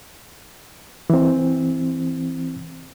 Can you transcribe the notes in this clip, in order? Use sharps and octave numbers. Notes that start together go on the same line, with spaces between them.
E3 C4